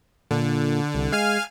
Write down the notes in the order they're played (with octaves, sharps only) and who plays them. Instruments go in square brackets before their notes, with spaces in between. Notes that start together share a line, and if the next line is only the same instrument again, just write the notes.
[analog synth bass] A#2 [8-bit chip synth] D3
[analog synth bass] C2
[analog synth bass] G#3 [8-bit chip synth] F5 G#5 F6